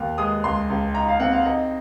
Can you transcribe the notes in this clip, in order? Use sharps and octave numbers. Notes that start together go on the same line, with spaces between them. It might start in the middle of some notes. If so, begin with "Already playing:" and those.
Already playing: D#2
G#3 D#6
C#2 C6
C#2
D#4 A#5
F5
C4 F#5
F5
D#4 D#5